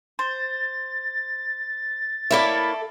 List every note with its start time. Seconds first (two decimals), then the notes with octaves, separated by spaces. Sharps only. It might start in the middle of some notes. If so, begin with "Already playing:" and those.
0.19 C5 A6
2.31 A#3 E4 A4 C#5 D5 E5